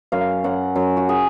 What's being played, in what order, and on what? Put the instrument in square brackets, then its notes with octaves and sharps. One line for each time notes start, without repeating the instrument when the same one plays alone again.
[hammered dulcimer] F#2 F5
F#2 F#5
F#2
F#4
G#4